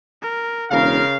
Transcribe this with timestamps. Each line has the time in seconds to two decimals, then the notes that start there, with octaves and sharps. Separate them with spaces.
0.22 A#4
0.71 E1 C#3 A#4 F5